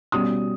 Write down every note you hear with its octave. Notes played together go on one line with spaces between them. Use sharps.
B2 G3 C#4 D#6